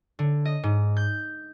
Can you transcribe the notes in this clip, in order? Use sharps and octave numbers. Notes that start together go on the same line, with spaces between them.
D3
D#5
G#2
G6